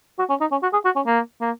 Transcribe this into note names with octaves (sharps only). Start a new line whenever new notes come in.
F#4
C#4
D#4
C#4
F#4
G#4
F#4
C#4
A#3
A#3